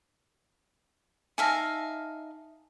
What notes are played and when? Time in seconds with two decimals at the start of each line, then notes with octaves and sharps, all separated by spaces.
1.38 D#4 E5 F5 G#5 A5 A#6